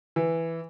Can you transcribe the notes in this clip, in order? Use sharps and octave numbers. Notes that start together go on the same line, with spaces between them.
E3